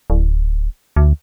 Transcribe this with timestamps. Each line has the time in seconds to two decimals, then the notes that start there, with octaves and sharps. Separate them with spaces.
0.10 D1
0.96 D2